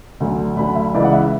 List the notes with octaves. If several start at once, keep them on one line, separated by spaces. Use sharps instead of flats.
D2 D3 F#3
D2 D3 F#3 B5
E5
C#2 C#3 E3 D5
F#5
E5